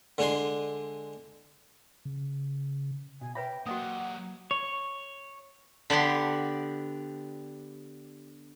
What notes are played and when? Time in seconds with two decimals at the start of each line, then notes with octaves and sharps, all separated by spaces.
0.18 D3 G#3 D4 G#5 C6
2.05 C#3
3.21 B2 G#5
3.35 B4 C#5 E5 G5 B5
3.66 F#3 A#3 F#4 G4 D#5 F#5 D#6
4.51 C#5
5.90 D3 B3 G4 C6